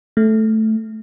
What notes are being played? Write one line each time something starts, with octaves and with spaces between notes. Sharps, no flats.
A3